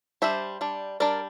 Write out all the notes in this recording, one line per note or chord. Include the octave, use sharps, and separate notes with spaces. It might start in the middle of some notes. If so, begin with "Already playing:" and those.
G3 D4 C5 E5
G3 D4
G3 D4 A#4 D5